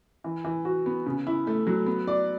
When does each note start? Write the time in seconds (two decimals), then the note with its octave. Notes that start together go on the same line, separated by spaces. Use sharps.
0.24 E3
0.45 E3
0.65 F#4
0.86 B3
1.06 C#3
1.27 E4
1.47 A3
1.67 F#3
1.86 B3
2.07 D5